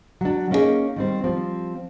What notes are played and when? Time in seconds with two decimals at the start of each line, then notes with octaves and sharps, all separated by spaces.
0.21 F#3 D4
0.51 A#3 C#4 D#4 E4 G#4 D#5
0.96 D#3 G3 C4
1.24 F3 G3 C4